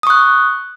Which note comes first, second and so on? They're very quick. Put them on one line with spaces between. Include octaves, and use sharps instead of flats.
D#6 C#6 F#6